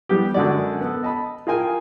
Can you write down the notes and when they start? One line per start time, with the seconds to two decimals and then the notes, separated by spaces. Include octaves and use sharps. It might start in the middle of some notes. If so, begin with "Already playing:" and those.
0.09 E3 G3 B3 G4
0.34 F#2 D3 G#3 F#4 D5
0.81 B3 A4
1.03 D#5 A5 B5
1.47 F4 G#4 A#4 G5 G#5